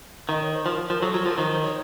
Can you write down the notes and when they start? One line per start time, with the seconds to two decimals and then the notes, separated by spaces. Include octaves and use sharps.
0.29 D#3 D#5
0.42 C#5
0.54 C5
0.66 F3 A#4
0.90 F3
1.02 F#3 A4
1.11 F4
1.14 F#3
1.26 F3 A#4
1.38 D#3 C5
1.51 C5
1.63 C#5